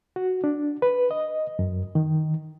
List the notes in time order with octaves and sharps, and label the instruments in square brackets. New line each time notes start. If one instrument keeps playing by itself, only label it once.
[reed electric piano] F#4
D4
B4
D#5
F#2
D#3